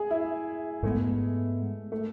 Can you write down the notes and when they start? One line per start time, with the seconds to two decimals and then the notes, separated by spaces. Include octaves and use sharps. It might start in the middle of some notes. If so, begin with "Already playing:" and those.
Already playing: G#4
0.11 E4
0.83 G#2 G#3 A3 B3
1.92 A3